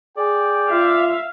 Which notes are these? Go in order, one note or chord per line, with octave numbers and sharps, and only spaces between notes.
G#4 D5 G5
F4 E5 F5